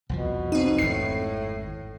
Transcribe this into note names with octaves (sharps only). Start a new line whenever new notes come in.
C2 F2 B2 F3
C4 D#4
G#1 F2 A2 C7